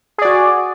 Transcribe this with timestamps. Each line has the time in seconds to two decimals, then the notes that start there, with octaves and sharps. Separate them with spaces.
0.18 G#4
0.22 D5
0.25 F#4